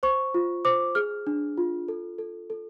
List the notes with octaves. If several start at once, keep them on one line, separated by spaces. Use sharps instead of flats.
C5 C#6
F4
C5 D6
G#4 F6
D4
F4
A4
A4
A4